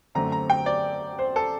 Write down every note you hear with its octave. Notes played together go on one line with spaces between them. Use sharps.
F#2 D3 A3 C4 A#5
A#5
G5
D5
C5
A4